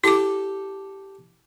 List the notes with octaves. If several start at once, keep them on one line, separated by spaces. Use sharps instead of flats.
E4 G4 A4 D6